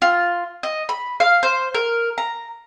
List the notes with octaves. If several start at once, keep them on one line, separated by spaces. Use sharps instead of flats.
F4
D#5
B5
F5
C5
A#4
A#5